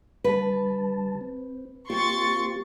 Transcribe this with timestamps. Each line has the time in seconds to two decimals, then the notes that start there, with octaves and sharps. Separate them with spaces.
0.24 D3 G3 B4 A5
1.21 C4
1.90 A#3 C4 F4 G4 C6 C#6 A6